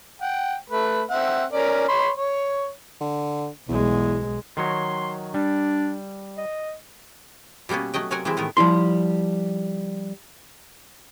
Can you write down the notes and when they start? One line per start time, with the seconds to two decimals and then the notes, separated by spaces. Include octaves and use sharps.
0.21 F#5 G5
0.69 A3 B4
1.10 C4 E5 F#5
1.52 C#4 A#4 D5
1.88 C#5 B5 C6
2.15 C#5
3.01 D3
3.68 B1 E2 G#3
4.57 D#3 F#3 C#5 C6
5.34 G3 D4
6.37 D#5
7.69 B2 G3 A#3 B3 C#4
7.94 F#3 A3 D#5 G5
8.11 C3 F#3 A#4 C#5 F#5 G#5
8.25 E3 G3 G#3 C4 E4
8.37 A2 D#3 A3 B3 A#4
8.57 F3 G3 E4 C6